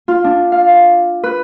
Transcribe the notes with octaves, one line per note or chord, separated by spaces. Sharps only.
F4
D4
F5
B4